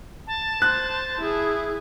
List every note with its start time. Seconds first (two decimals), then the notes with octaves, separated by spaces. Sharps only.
0.27 A5
0.62 C5 F#6
1.18 E4 G#4